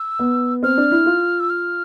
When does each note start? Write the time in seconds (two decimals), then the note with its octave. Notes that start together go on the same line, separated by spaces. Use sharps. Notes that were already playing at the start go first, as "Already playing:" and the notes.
Already playing: E6
0.19 B3
0.63 C4 F6
0.77 D4
0.91 E4
1.06 F4
1.40 E6
1.50 F6